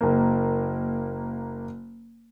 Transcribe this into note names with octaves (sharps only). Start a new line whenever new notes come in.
F#1 A#3